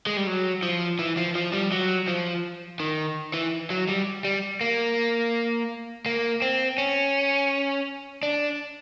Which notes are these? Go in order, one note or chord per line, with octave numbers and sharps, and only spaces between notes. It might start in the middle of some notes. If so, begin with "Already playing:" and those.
G#3
G3
F#3
F3
E3
F3
F3
G3
F#3
F3
D#3
E3
F#3
G3
G3
A#3
A#3
C4
C#4
D4